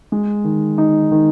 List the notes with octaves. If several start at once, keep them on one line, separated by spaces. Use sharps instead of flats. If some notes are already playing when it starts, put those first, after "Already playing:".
G#3
D#3
D#4
D#3